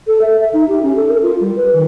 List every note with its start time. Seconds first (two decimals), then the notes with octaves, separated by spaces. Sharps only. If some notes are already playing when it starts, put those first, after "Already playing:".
0.07 A4
0.22 E5
0.40 E5
0.54 D#4
0.68 G4
0.83 C#4
0.96 A4
1.09 A#4
1.22 F4
1.41 G3
1.56 B4
1.74 D#3